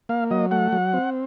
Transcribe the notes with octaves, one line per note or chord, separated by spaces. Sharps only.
A#3 F5
F#3 D#5
A3 F#5
F#3
C4